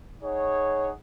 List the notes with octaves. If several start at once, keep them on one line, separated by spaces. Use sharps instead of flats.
D#4 G#4 C#5 F#5